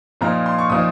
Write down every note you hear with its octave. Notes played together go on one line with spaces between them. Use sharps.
A#2 F3 A#3 D#4 A#5
C6
C#6
A#2 F3 A#3 D#4 D#6